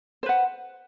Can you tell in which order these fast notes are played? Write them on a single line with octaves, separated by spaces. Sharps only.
C5 B4 F#5